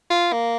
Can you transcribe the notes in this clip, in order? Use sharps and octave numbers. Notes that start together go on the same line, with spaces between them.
F4
A#3